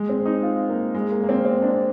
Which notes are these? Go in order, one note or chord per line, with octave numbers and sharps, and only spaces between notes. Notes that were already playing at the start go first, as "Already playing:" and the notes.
Already playing: G#3
C4
D#4
F4
A#3
G#3
A#3
A#3
C4
C4
D4